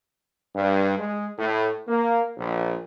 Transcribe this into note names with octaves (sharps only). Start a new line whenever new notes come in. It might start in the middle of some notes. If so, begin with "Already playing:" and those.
G2
G#3
A2
A#3
A#1